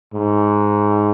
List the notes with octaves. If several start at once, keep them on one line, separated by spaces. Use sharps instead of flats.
G#2